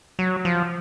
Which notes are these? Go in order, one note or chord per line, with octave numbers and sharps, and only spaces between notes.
F#3
F3